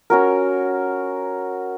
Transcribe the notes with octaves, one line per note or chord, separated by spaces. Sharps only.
C#4 F#4 A#4